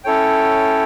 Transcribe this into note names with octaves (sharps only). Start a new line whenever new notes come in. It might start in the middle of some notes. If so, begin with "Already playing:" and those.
C#4 E4 A4 C#5 G5